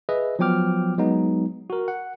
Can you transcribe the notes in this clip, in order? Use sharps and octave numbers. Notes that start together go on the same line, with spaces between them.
G#4 B4 D#5 E5
F3 F#3 B3 G5 D6 F6
F#3 G#3 B3 D#4
F#4 A#4
F#5